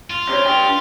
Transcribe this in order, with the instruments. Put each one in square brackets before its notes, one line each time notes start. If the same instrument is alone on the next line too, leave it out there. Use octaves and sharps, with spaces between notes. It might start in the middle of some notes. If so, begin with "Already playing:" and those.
[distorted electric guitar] F4
[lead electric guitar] C3 C#5
D4 G5